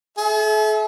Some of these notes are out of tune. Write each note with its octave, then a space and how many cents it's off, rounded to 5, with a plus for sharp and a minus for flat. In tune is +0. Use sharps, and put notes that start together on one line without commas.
A4 -45 E5 -15